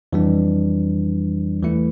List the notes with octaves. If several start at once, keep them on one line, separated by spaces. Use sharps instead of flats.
F2 E3 G3 D4
E2 E3 A3 E4